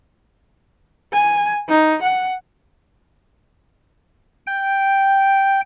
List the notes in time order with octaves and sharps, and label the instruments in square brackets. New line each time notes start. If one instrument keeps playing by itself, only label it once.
[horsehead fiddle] G#5
D#4
F#5
[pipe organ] G5